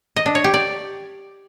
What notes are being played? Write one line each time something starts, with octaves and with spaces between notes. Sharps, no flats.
D#5
D4
C#5
G4
D5